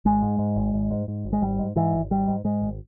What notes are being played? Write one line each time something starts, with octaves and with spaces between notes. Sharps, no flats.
G#1 G#3
G#2
G#2
G#1
G#1
G#2
G#2
G#1
G#3
G#1 G3
G#2
G#2 E3
G#1
G#1 G3
G#2
G#2 G#3
G#1